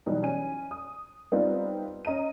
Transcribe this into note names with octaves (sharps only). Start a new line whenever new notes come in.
B2 E3 F#3 G3 D#4
C#4 G#5 D#7
D#6
G3 B3 C4 D#4 F4
C#4 D#5 A#5 D#7